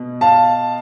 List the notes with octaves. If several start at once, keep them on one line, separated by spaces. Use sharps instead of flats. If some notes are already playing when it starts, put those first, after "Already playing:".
Already playing: B2
F5 A5